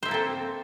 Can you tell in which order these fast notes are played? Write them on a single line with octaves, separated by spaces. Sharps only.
C5 E5 A#3 A4 C4